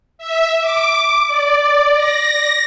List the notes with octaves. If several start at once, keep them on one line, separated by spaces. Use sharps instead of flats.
E5
D6
D5
A#6